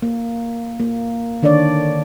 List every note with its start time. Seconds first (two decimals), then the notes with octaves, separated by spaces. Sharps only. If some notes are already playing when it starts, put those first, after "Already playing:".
0.02 A#3
0.80 A#3
1.42 D3 D#3 D4 C#5 D5